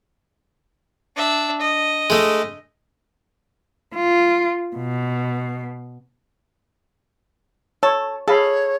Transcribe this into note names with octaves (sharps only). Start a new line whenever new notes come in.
D4 E5
D#5
G#3 A3
F4
B2
A4 C#5
G#4 A4 C#5 F5 B5